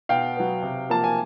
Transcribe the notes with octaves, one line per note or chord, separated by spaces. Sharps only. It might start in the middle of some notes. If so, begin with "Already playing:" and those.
B2 F5 G5
F#3 B3
C3
F3 A#3 A5
G#5